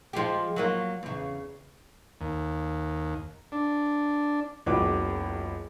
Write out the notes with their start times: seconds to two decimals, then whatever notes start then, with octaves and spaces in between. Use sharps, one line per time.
0.13 F3 G#3 G4
0.56 F#3 A#3 F4
1.03 E2 C#3
2.21 D#2
3.52 D4
4.66 F#1 C#2 B3 F#4 B4 D6